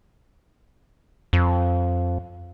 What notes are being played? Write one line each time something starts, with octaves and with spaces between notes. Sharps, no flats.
F2